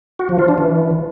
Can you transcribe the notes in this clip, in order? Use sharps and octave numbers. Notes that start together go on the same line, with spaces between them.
F#4
F3
F4
D4
E3